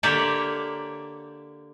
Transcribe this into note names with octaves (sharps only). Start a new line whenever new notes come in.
D3 A#3 G4 C#5 D5 E5